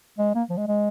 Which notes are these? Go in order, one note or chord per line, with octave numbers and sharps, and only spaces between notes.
G#3
A#3
F3
G#3
G#3